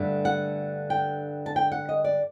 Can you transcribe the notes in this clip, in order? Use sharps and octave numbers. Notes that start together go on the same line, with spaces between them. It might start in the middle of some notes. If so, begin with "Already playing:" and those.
Already playing: G2 D3 A3
F#5
G5
A5
G5
F#5
D#5
D5